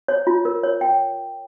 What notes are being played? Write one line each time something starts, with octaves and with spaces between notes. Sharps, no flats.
C#5
F4
A#4
C#5
G5